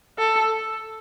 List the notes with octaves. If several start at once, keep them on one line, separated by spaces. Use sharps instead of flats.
A4